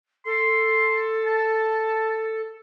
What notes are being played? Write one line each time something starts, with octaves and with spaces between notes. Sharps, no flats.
A4 C6
A5